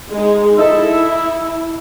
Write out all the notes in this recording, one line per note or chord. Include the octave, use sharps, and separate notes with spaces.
G#3 D#4
D#4 E4 A4 E5